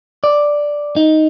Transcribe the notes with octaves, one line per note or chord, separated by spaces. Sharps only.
D5
D#4